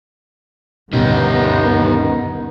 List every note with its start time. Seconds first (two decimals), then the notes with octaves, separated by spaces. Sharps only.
0.93 D2 G2 B2 D#3 B3 C#4 D#4 G4